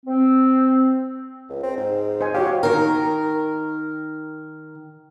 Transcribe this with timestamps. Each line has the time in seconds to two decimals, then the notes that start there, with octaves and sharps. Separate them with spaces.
0.06 C4
1.50 C#2
1.63 C4
1.77 G#2
2.21 C5 D#5 G#5
2.34 F#4 G4 C#5 F5
2.63 D#3 A#4